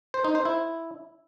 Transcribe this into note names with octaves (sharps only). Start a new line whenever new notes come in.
C5
D#4
C5
E4